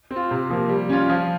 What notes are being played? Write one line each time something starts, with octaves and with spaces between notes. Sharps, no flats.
C4
F4
C3
F3 A#3
G3
C#4 F4
F3